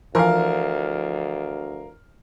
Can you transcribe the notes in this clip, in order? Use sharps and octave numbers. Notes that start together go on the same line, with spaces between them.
D2 E3 F3 A#4 F5